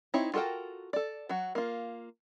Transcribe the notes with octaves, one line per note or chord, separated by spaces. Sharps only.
C4 D#4 E4 C#5
F4 F#4 A4 A#4 G5
A4 D5
F#3 F#4
A#3 F4